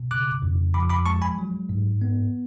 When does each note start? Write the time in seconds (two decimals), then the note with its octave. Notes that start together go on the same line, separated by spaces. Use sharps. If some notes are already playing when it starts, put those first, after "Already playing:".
Already playing: B2
0.11 C#3 D6 F#6
0.42 F2
0.74 F3 B5 D6
0.90 B5 D6
1.06 G#3 A5 C#6
1.22 G#5 B5
1.38 F#3
1.69 G#2
2.01 B3